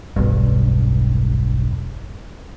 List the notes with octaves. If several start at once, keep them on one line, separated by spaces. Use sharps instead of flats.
E1 B1 G2